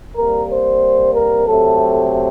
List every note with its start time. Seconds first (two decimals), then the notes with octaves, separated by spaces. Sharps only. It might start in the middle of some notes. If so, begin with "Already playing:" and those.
0.16 C3 G3 A#3 A#4
0.49 C5
1.14 A#4
1.46 C3 F#3 A3 A4